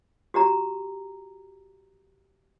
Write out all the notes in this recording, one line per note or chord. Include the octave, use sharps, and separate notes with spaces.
F#4 G4 A#5